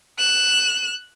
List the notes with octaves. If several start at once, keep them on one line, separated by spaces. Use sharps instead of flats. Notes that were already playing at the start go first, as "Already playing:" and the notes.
F#6 E7